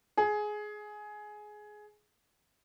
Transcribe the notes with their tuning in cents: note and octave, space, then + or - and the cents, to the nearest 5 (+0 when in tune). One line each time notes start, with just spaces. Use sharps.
G#4 +15